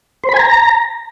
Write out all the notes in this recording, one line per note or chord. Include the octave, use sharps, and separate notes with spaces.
C5
B5
G#5
A#5